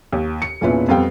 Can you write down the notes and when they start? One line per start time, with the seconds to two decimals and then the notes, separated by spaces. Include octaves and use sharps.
0.13 D#2
0.42 C#7
0.61 E1 A#2 C#4 E4 F4 B4
0.88 F2 G3 B3 F5 G5